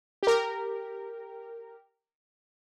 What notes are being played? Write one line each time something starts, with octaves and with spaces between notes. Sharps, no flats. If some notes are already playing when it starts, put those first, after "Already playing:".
G4 A#4